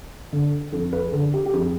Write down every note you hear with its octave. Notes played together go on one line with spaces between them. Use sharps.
D3
F2 A4
B4
G#4
D3 A4
G4
G4
F2 G#4